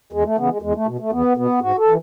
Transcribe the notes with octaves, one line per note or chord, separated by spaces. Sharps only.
E2 G#3
A3
C#3 E3 B3
G#3
E2 G#3
A3
B2
A3
E2 B3
B2 B3
G#2 F#4
A4
E3